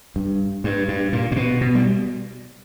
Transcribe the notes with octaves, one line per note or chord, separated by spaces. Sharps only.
G2
G2
G2
A#2
A#2
B2
B2
G3